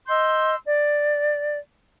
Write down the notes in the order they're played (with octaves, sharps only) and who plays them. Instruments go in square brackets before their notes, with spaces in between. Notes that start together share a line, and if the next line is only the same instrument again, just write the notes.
[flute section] D#5 C6 E6 G6
D5